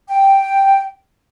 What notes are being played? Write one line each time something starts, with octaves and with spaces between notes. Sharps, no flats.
G5